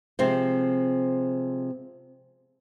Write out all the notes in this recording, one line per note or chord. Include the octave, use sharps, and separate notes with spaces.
C3 F3 G#3 C4 C5